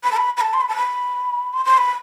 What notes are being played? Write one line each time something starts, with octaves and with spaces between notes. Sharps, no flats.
B5
A5
B5
B5
A5
C6
B5
A5
B5
C6
C6
B5